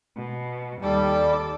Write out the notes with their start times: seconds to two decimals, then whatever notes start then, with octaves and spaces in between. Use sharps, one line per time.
0.17 B2
0.82 D#2 G3 A4 D6